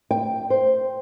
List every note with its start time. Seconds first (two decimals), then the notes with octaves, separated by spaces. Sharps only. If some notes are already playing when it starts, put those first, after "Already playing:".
0.11 G5
0.50 C5